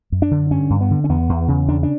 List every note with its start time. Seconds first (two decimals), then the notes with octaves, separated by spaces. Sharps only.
0.12 F#2
0.22 D4
0.31 D3
0.51 G2 C#4
0.70 G2
0.81 B3
0.91 D3
1.04 C#4
1.09 E2 B3
1.29 E2
1.48 C#3
1.68 E2 D4
1.83 D4